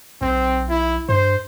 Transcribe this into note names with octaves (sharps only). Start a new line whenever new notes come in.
B1 C4
E4
G2 C5